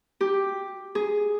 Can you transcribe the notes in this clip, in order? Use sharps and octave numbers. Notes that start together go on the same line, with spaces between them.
G4
G#4